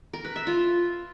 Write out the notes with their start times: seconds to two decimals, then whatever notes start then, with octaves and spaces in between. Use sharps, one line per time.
0.13 A#4
0.25 B4
0.36 E5
0.47 F4